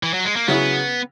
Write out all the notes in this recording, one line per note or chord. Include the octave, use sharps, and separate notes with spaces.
E3
F#3
G#3
A#3
C#3 F#3 B3 C#4 E4 G#4